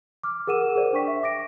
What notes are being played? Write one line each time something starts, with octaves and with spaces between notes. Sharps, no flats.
D6 F6
G#4 A#4 F#5 D#7 E7
G#4 A#4 C5 D5
D4 G5 C#6 B6
E5
D6 A#6 D7